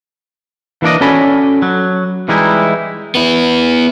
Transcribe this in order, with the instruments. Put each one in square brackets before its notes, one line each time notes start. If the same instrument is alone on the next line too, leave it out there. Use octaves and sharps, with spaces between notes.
[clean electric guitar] E3 A#3 D4 D5 D#5
C#4 F#4 A4 D5 G#5 B5
F#3
E3 G3 G#3 D#4 E4
[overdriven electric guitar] B3 E4